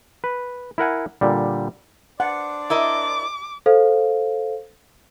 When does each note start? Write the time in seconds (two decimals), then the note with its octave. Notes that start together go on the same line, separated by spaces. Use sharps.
0.24 B4
0.78 E4 A#4 F#5 G#5
1.21 A#2 D3 G3
2.20 D4 C5 D5 F#5
2.70 E4 A#4 D#5 D6
3.66 A4 C5 F5